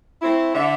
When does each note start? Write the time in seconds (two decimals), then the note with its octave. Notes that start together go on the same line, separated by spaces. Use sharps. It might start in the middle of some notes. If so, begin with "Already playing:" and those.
0.22 A3 C4 E4
0.54 D3 E5